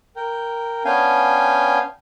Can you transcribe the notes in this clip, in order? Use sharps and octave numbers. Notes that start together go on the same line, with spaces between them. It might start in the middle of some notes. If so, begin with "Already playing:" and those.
A#4 G5
B3 C#4 D4 F5 G5 G#5